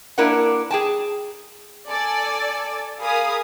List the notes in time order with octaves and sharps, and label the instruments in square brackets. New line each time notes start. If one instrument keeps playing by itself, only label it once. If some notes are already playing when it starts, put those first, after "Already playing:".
[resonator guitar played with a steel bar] A#3 D4 E4 A#4 B4 F#5
G#4 G5 A5
[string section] A4 D5 G#5
G#4 A#4 F5 G#5 B5 D#6